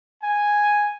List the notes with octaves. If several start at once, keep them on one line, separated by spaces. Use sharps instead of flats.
G#5